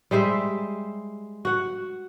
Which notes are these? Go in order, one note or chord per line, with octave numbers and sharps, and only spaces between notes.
G3 G#3 C5 E5
F#4 F#5